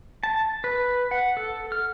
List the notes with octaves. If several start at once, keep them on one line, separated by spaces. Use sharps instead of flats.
A5
B4
F#5
A4
F6